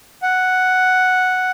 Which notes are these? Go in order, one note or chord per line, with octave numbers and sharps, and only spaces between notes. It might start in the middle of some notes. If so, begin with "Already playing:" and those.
F#5